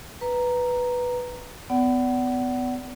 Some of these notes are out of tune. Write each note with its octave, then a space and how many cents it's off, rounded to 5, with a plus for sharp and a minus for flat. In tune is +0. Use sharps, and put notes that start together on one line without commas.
B4 +0 A#5 +0
B3 +30 D5 -30 F#5 +30